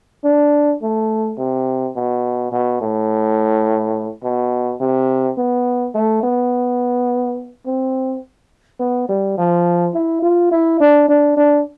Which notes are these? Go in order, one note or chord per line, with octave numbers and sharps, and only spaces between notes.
D4
A3
C3
B2
B2
A2
B2
C3
B3
A3
B3
C4
B3
G3
F3
E4
F4
E4
D4
D4
D4